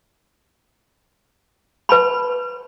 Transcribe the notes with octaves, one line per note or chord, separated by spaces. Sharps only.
B4 A5 B5